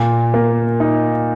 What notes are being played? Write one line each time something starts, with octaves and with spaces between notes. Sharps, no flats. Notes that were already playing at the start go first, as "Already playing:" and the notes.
Already playing: A#2
A#3
D#4